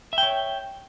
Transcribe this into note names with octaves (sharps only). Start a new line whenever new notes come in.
C#5 E5 G5